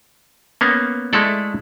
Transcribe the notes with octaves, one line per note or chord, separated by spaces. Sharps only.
A#3 B3 C#4 F5
G#3 A3 E4 A4 D5